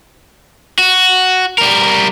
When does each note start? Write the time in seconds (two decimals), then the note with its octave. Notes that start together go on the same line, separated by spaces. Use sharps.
0.79 F#4
1.58 G3 A#4